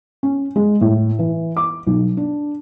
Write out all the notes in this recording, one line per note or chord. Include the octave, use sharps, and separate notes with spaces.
C#4
G#3
A2
E3
D6
B1
D4